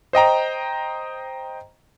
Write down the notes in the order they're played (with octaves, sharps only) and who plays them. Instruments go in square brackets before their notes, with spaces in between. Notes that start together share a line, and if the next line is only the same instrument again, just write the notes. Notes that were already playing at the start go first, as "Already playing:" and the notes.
[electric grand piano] C5 D#5 G5 A#5